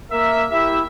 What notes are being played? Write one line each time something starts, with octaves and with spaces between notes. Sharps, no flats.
A#3 A#4 E5
E4 G4 E5